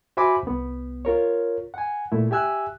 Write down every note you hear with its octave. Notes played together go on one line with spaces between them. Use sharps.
F#4 C5 E5 G#5 B5 D6
C2 B3
F4 A#4 C#5
F#5 G#5
A#2 A3 E4
G4 E5 G#5 E6 F#6